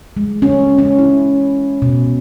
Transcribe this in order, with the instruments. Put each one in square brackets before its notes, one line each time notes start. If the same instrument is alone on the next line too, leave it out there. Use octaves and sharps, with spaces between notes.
[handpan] G#3
C#4
C#4
E4
B2